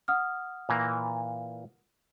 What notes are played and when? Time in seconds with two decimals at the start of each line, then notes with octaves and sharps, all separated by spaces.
0.08 F#5 D#6 F6
0.69 A#2 E3 A#3